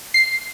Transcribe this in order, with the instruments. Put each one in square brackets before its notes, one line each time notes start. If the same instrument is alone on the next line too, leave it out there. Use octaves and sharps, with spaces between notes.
[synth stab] C7